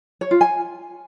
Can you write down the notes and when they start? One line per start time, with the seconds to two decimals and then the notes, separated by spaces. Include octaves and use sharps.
0.21 C#5
0.31 F4
0.41 G#5